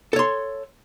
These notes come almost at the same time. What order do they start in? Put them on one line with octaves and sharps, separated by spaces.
A4 C#5 C6